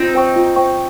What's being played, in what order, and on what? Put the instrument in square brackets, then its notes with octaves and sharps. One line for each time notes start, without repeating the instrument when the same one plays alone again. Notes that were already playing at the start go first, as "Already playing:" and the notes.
Already playing: [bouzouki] C4 D#4 [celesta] F4
[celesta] C5 G5 C#6
F4
C5 G5 C#6